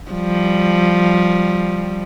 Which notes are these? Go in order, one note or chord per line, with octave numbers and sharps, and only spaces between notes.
F3 G3